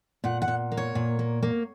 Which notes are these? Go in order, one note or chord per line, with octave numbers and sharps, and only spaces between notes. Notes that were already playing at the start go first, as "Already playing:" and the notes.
A#2 F#5
F#5
A#2
A#3
C#5
A#2
A#3
A#3